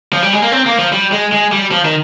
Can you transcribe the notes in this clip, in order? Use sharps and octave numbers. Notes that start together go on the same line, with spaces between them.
F3
G3
G#3
A#3
C4
A#3
F3
G3
G#3
G#3
G3
F3
D#3